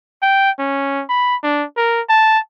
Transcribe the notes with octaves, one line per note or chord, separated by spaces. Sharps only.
G5
C#4
B5
D4
A#4
A5